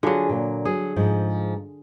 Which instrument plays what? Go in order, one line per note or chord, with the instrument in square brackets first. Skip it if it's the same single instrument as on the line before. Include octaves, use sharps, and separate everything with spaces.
[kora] D3 F#3 [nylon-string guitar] F4 G#4
[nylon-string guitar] A#2
[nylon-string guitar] F#3 [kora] G#4
[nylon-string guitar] G#2 F3